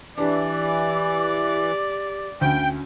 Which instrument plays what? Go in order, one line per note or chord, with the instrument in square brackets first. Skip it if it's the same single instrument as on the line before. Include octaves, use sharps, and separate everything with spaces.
[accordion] E3 [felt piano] D4 [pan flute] G4 [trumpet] D5
[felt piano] D2 [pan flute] C#4 [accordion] G5